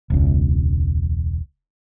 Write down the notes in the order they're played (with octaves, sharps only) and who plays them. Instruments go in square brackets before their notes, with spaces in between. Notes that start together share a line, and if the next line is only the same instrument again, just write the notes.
[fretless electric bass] E1 C#2